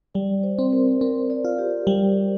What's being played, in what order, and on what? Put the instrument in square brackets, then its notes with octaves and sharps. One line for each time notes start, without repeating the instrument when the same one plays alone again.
[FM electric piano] G3 [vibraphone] D5
[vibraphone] C5
[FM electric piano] C4
[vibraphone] A#4
[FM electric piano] C4 [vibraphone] A#4
[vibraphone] D5
[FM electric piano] F4
[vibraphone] G4
[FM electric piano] G3